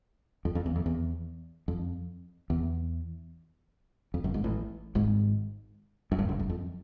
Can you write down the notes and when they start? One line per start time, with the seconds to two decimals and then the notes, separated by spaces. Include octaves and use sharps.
0.45 F2
0.55 F2
0.66 E2
0.76 F2
0.86 E2
1.68 F2
2.50 E2
4.14 F2
4.24 F#1 F#2
4.34 G#1 G#2
4.44 A1 A2
4.95 G#1 G#2
6.12 F#2
6.19 G1 G2
6.29 F#1 F#2
6.39 F#1 F#2
6.49 F2